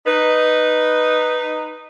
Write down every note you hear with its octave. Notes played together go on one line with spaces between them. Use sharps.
D#4 B4